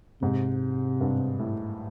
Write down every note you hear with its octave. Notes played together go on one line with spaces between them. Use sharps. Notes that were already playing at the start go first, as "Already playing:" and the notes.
G#2 C3
G2
A2